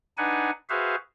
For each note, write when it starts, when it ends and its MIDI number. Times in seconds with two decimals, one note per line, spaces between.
0.18 0.50 62
0.18 0.50 63
0.18 0.50 71
0.18 0.50 78
0.18 0.50 80
0.70 0.96 66
0.70 0.96 68
0.70 0.96 71
0.70 0.96 72
0.70 0.96 76
0.70 0.96 77